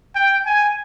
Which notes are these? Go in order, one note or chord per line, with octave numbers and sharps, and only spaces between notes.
G5
G#5